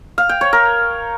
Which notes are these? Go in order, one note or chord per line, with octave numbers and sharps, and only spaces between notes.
F5
G5
C#5
A#4